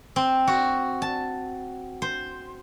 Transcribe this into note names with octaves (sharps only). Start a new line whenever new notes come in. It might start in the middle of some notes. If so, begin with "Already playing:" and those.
C4
F#4
A5
C5